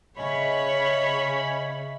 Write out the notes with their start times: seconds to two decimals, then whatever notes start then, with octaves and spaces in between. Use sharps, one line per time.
0.18 C#3 C#4 C#5 D#5 E5 B5 C#6